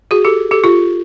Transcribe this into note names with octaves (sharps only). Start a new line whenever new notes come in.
F#4 G#4
G4 A4
G4 A4
F4 G4